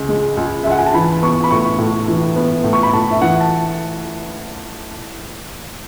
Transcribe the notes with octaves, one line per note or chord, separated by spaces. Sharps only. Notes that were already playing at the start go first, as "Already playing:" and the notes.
Already playing: C#2 C#3
G#3
C#2
C#2 E5
F#5
G#5
A5
E3 B5
B3 C#6
B5
A2 C#6
A2
E3
B3
A2
C#6
B5
A2 A5
E5
E3 F#5
A5